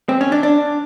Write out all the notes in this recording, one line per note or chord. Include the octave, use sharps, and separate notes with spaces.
C4
C#4
D4
D4